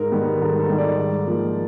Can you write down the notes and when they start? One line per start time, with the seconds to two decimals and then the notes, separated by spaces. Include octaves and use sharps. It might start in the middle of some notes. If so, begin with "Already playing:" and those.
Already playing: G#2 A#4
0.12 D#3 G3 B3
0.41 G#2 A4
0.60 A4
0.69 D#3 G3 B3
0.78 D5
0.98 G#2
1.27 F3 A#3